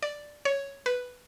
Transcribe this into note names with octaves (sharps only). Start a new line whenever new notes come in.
D5
C#5
B4